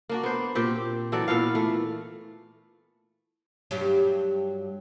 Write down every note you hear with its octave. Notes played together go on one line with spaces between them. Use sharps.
A#3 D4 F#4
B3 C5
A#2 C4 G4
E3 F#3 A4 D5
A#2 E3 B3 F5
A3
G2 F#3 G4